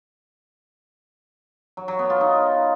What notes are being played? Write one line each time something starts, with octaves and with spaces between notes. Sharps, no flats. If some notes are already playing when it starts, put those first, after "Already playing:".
F#3
F#3
B3
F4
D#4